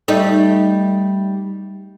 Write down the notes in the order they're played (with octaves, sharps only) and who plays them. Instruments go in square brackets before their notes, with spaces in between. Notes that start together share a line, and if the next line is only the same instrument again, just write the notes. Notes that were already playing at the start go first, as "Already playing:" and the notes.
[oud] G3 A3 D#4